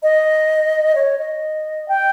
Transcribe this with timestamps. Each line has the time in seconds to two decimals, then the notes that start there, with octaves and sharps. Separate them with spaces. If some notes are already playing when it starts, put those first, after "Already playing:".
0.03 D#5
0.95 C#5
1.19 D#5
1.88 G5